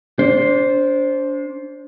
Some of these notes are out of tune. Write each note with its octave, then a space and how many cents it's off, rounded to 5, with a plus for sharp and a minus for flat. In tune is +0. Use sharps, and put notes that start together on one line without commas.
D4 -30 C5 +5